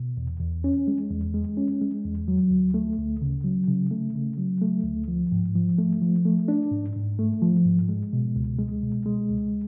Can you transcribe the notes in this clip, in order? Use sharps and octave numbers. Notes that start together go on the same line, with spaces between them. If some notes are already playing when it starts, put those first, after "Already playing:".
Already playing: B2
E2
E2
C#4
G#3
E2
G#3
C#4
G#3
E2
F#3
D2
A3
D2
C#3
F#3
C#3
A3
C#3
F#3
A3
D2
F3
G#2
F3
A3
F3
A3
D4
G#2
G#2
A3
F3
G#2
G#3
B2
C#2
G#3
B2
G#3
C#2